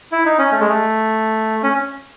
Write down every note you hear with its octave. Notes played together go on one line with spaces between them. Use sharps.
E4
D#4
C#4
A3
G#3
A3
C#4